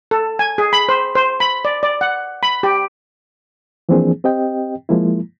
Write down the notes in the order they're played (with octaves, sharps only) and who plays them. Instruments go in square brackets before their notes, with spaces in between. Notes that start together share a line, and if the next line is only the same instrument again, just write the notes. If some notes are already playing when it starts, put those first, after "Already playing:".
[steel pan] A4
G#5
G#4
B5
C5
C5
B5
D5
D5
F#5
B5
G4
[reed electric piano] E3 F3 A#3 C4 D4 G#4
C4 G4 D#5 G5
F3 G#3 A#3 E4